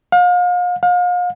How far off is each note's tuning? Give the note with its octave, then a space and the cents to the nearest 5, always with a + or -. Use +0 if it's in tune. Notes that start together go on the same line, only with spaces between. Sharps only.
F5 +40
F5 +40